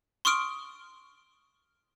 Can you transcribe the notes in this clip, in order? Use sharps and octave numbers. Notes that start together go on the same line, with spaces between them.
C6 C#6 D#6 F6 D7